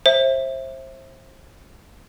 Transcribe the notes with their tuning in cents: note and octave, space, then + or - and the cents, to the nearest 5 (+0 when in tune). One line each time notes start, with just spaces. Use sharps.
C5 +30 E5 +0